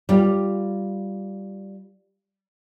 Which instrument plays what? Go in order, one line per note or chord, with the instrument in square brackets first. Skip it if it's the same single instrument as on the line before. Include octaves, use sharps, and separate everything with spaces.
[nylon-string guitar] G3 F4